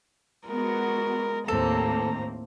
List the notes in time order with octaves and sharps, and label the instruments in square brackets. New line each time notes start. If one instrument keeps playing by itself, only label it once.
[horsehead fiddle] G#3 A#4 [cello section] B3 F#4
[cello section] D#2 [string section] A2 A#3 C4 [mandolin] A4 [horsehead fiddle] A#5